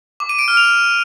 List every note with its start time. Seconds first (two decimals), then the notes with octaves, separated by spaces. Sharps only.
0.20 D6
0.29 D#7
0.39 D7
0.48 F6
0.57 F7